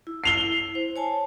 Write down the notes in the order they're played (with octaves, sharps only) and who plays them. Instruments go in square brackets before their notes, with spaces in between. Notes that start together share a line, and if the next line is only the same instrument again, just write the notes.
[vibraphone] E4
[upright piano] C7 F7 G7
[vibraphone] C5
C#5 G#5 A5